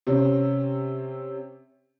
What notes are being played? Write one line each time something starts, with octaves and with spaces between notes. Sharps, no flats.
C3 C4 C#4